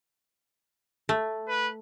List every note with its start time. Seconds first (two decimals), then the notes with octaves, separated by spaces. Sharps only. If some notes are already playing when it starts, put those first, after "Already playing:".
1.09 A3
1.48 B4